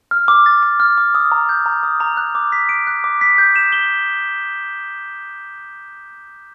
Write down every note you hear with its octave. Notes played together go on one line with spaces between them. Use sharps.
F6
D6
A6
D6
F6
D6
D#6
A#5
G6
A#5
D#6
A#5
F#6
D6
B6
D7
F#6
D6
B6
G6
E7
G7